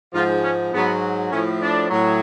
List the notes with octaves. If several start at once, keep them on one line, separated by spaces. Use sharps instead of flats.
G#2 F3 F4
C#4
G#2 F#3 B3
A2 F3 C#4
D4
A2 F#3